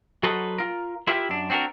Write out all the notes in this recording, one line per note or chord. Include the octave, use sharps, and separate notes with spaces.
F#3 F#4 A4 B4 C5 D#5
F4 A#4
E4 F4 G4 A#4 E5
F#2 D4
C4 D4 F#4 G4 A#4